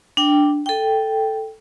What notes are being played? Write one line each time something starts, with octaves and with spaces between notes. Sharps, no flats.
D4 G5
A4 G5